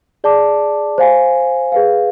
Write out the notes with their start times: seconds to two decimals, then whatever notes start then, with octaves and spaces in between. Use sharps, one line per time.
0.24 G#4 D5 A5 D6
0.98 C5 F5 G#5
1.72 G#4 B4 F5